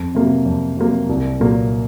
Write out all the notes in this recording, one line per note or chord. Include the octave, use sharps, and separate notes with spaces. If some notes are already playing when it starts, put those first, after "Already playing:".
Already playing: F2
C3 F#3 A#3
F2
C3 F#3 A#3
C2
A#2 F#3 A#3